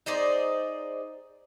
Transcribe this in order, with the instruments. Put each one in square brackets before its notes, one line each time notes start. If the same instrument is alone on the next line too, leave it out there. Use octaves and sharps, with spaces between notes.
[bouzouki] D#4 G#4 C5 D5